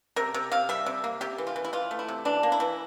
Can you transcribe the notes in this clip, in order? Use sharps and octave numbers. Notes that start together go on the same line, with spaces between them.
C3 A#4
C3
C3 F5
G3 E5
C3
A#3
C3 G4
E3
F4
E3
E4
E3 F4
A3
E4
C3
E3 D4
A#3
E4
E3